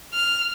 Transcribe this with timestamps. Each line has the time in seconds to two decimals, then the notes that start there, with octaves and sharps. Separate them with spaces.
0.13 F6